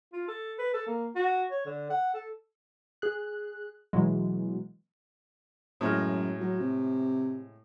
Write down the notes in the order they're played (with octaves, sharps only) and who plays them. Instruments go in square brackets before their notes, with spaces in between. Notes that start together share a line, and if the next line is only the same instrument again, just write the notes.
[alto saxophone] F4
A4
B4
A4
A#3
F#4
C#5
D3
F#5
A4
[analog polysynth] G#4 F#6
B2 E3 F#3 G#3
[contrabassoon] F#2 [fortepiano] A2 G#3 F6
[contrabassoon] F#3
C3